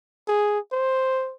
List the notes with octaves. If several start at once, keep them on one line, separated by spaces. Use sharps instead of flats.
G#4
C5